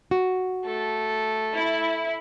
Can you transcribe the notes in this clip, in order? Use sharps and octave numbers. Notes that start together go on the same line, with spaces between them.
F#4
A3 A4
E4